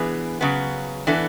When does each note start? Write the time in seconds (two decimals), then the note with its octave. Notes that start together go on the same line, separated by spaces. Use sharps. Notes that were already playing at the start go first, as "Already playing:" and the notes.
Already playing: E3 B3 D4 G#4 B4
0.41 C#3 F#3 B3
1.07 E3 B3 D4 A4